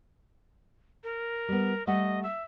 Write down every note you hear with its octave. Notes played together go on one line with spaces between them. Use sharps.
A#4
G3 B3
G3 A3 D#5 F#5
E5